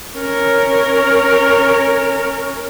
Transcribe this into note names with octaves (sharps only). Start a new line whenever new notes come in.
C#4 A#4